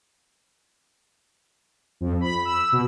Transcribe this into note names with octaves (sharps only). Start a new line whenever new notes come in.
F2
B5
E6
B2